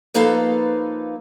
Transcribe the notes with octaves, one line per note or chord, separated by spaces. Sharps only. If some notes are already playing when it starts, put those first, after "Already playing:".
F3 A#3 D#4 A4 B4 F5